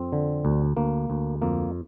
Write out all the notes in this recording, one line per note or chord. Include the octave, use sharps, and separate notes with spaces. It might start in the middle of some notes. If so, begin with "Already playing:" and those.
Already playing: F2 C4
D3
D2
D2 A#3
D2
F2 A#3